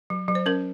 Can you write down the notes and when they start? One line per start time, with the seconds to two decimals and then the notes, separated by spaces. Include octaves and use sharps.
0.10 F#3
0.28 F#3
0.35 C5
0.46 C#4 A#4